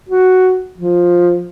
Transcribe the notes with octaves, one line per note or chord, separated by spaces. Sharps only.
F#4
F3